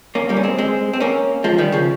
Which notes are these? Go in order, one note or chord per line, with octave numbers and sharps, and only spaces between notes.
A#3 C#4
G3 A#3
C#4
G#3 C4
G#3 C4
C4
A#3 C#4
F3 G#3
D#3 G3
C#3 F3